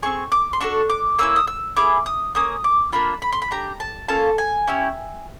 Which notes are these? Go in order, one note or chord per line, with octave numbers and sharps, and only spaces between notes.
C4 D#4 G#4 C#6
D6
C6
D4 F#4 A4 C#6
D6
A#3 C#4 E4 E6
D#6
E6
B3 E4 G#4 D6
D#6
A#3 C#4 D#6
D6
A#3 D4 F4 B5
B5
C6
B5
D4 G4 A#5
A5
A#3 C#4 F4 A4 A5
G#5
C#4 E4 G4